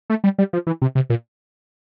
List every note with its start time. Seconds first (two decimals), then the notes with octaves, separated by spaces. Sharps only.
0.10 A3
0.24 G3
0.38 G3
0.53 F3
0.67 E3
0.82 C3
0.95 C3
1.10 A#2